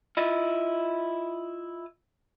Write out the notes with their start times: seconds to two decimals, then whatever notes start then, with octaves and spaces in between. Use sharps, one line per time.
0.17 E4 F4 D#5